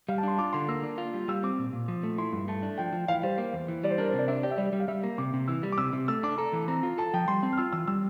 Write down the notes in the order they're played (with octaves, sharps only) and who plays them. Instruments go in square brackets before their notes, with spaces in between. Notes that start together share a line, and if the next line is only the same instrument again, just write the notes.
[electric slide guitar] G3 [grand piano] F5
[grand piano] A5
[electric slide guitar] D4 [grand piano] C6
[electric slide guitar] F4 [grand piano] D6
[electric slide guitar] D3 [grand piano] C6
[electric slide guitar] A#3 [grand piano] E6
[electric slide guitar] D4
F4
G3
[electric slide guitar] G3 [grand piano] E6
[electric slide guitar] C4 [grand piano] D6
[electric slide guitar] A#2
A#2
F3
A3
[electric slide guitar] E4 [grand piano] C6
[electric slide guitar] G2
[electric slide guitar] A3 [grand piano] A5
[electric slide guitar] D4
[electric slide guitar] F3 [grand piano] G5
[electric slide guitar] F3
[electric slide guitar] E3 [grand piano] F5
[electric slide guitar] G3 [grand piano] C5
[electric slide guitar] A#3
E2
E3
[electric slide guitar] G3 [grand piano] D5
[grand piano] C5
[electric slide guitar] D4 [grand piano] A#4
[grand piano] C5
[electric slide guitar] C3
[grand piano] D5
[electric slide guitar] D4 [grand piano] E5
[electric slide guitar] G4 [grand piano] D5
[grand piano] E5
[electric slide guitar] G3 [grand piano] D5
[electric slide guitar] G3
[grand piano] F5
[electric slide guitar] G3 [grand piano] E5
[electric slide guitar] A#3
[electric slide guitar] C3 [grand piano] D6
[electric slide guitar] C3
[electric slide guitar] E3 [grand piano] E6
[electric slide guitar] G3
[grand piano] D6
[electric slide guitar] C3 [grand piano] E6
[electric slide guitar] C3
[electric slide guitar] A3 [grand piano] E6
[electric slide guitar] D4 [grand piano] D6
[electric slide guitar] A4 [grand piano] A#5
[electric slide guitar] E3
[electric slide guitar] C4 [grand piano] A#5
[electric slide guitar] F4
[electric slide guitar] A4 [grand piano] A5
[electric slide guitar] F3 [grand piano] G5
[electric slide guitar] G3 [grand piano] C6
[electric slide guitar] C4
[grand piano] F6
[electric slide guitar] F4 [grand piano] E6
[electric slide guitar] E3 [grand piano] E6
[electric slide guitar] G3 [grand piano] E6